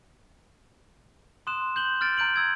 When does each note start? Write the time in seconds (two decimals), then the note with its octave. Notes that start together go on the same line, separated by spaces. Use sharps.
1.47 C6 D#6 F#6 E7
1.76 G6 F#7 G7
2.01 F6 G6 A6 D7
2.18 A#5 G6 D7 F#7
2.34 E6 G#6 D7